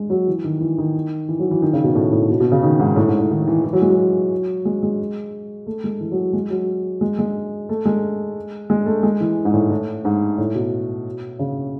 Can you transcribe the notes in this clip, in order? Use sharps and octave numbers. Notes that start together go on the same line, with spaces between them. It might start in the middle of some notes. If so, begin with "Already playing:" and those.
Already playing: G#3
F#3
E3
D#3
E3
D#3
E3
F#3
E3
D#3
C#3
B2
A2
A2
B2
B2
C#3
D#3
G#2
A2
G#2
A2
D#3
E3
E3
F#3
G#3
F#3
G#3
G#3
A3
G#3
E3
F#3
G#3
F#3
G#3
G#3
A3
G#3
G#3
A3
G#3
E3
G#2
A2
A2
G#2
A2
B2
C#3